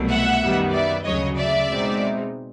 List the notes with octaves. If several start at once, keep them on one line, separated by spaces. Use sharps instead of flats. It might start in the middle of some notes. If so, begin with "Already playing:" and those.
Already playing: C2 B2 F#3 A3
E5 F#5
F#2 D#3 G3 B3
D5 E5
D2 C#3 F#3 C#5 D#5
D5 E5
B2 G#3 C4 D#4